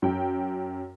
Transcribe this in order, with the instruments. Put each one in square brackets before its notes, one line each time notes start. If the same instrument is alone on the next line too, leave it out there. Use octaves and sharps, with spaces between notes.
[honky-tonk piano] F#2 G5